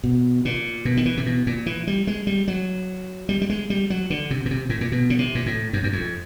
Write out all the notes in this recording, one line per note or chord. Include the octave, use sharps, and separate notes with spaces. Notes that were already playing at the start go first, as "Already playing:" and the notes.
B2
A#2
B2
D#3
E3
C3
B2
A#2
E3
G3
G#3
G3
F#3
G3
G3
G#3
G3
F#3
D3
C3
B2
C3
A2
A#2
B2
C#3
C3
A#2
A2
F#2
F#2
F2